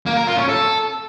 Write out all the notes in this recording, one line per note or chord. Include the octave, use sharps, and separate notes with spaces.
A#3
A#4
F4
C#4
A4